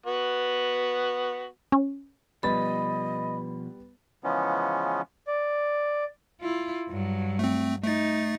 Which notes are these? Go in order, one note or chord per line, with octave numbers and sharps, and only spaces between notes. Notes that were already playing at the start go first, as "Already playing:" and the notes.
B3 F#4
C#4
B2 F3 G3 B3 D#5 B5 A6
C#3 E3 F3 G#3 B3 C#4
D5
E4 F4
G2 F#3
A3 C4
A3 D#4 A6